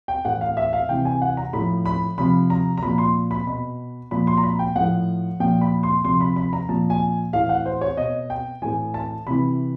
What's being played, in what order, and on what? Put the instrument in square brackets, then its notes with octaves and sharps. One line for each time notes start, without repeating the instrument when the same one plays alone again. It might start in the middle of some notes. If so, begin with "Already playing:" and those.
[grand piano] G5
A2 E3 F#5
F5
E5
F5
C3 E3 G5
G#5
F#5
A#5
A2 F3 B5
B5
C3 F3 B5
A#5
A#5
A#2 F3 B5
C6
B5
B2 B5
A#2 F3 B5
C6
A#5
B5
G5
A2 F3 F#5
A#2 F3 G5
B5
C6
C3 F3 C6
B5
B5
A#5
A#2 F3 A5
G#5
A2 E3 F5
F#5
C5
C#5
B2 D#5
G5
A2 E3 G#5
A5
C3 E3 B5